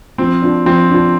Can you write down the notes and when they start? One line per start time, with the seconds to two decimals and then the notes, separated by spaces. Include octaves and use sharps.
0.18 F3 C4
0.42 D4 F4
0.66 F3 C4
0.90 D4 F4